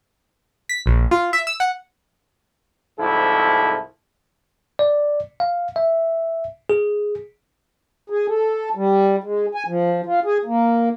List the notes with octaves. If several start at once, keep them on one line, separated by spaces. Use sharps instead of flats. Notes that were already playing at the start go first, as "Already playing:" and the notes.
B6
A#1
F4
E5
E6
F#5
C2 G#2 F3 E4 A4
D5
F5
E5
G#4
G#4
A4
G3
G#3
G#5
F3
F4
G#4
A#3